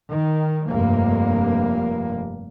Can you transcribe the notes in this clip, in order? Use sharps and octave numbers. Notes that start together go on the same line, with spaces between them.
D#3
F1 G2 A#3